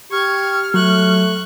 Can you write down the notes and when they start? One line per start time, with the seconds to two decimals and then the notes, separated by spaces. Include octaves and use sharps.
0.12 G4 C#6 F6 G#6
0.74 F#3 A3 C#6 F#6